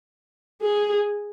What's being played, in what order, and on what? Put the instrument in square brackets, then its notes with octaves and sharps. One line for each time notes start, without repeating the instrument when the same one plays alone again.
[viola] G#4